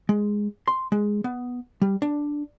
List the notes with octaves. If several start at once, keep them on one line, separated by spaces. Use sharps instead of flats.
G#3
C6
G#3
B3
G3
D4